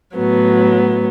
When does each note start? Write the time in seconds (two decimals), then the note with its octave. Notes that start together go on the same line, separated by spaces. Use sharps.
0.16 A2 F#3 B3